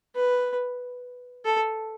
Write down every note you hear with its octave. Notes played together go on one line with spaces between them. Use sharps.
B4
A4